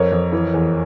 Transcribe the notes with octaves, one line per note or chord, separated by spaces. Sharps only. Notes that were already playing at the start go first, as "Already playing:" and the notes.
Already playing: F2 A#4 C#5
F2
E3
E2